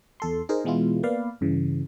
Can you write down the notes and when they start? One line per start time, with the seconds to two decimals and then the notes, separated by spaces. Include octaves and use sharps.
0.20 E2 A4 C6
0.49 D#4 G#4 A#4 C5
0.65 B2 E3 G#3 B3 E4 F4
1.03 A#3 B3 B4 D5 F5
1.41 G2 C#3 E3